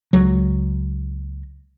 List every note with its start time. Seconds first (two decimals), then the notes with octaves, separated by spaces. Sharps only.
0.13 C#2 F#3